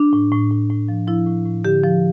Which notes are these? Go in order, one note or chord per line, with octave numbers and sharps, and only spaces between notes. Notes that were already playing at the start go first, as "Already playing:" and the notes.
Already playing: D4
A2
A2
A2
A2
F3
F3 E4
A2
A2
D3 G4
F3